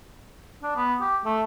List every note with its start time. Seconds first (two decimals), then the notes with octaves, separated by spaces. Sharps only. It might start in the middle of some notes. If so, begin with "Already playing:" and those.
0.63 D4
0.76 B3
1.01 G4
1.25 A3